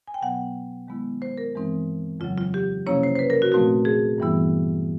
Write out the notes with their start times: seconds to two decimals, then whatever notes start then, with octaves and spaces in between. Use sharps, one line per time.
0.07 G#5
0.14 G5
0.21 B2 F#3 B3 F#5
0.88 D#3 G#3 B3 E4
1.22 C5
1.38 A#4
1.54 G2 E3 G#3 C4 D#4
2.20 F2 C#3 F#3 F4
2.38 F4
2.54 G4
2.86 C3 F3 A#3 C#4 E4 C#5
3.03 C5
3.16 C5
3.19 B4
3.30 A#4
3.42 F#4
3.52 A#2 F3 A3 C4 D#4 F#4
3.85 G#4
4.18 G2 E3 G3 B3 E4